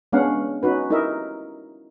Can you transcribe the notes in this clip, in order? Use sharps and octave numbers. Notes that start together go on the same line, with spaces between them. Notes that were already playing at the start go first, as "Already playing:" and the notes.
G#3 B3 C#4 D4 F5 F#5
C#4 D#4 F#4 B4
D#4 E4 G4 A#4 D#5 E5